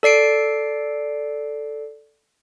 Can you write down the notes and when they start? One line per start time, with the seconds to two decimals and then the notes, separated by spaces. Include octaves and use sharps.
0.03 A4 D5 C7 D7